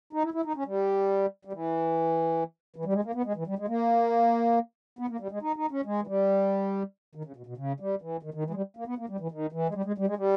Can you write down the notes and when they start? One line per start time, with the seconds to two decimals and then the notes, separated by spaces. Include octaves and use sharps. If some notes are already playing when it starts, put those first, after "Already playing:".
0.13 D#4
0.24 E4
0.34 E4
0.45 D#4
0.56 C#4
0.66 G3
1.45 G3
1.53 E3
2.76 E3
2.85 G3
2.93 G#3
3.04 A#3
3.15 B3
3.25 G#3
3.36 E3
3.47 G3
3.59 G#3
3.68 A#3
4.99 B3
5.09 A#3
5.20 G3
5.31 G#3
5.42 D#4
5.56 D#4
5.71 C#4
5.85 G#3
6.02 E3
6.07 G3
7.15 D#3
7.25 C#3
7.36 B2
7.46 B2
7.57 C#3
7.80 G3
8.02 E3
8.23 D#3
8.34 D#3
8.45 E3
8.50 G#3
8.55 G3
8.77 A#3
8.87 B3
8.98 A#3
9.09 G3
9.20 E3
9.31 D#3
9.52 E3
9.69 G#3
9.74 G3
9.85 G#3
9.98 G3
10.07 G#3
10.17 G3